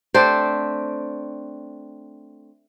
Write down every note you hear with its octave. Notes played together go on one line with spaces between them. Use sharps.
A3 C4 D4 C5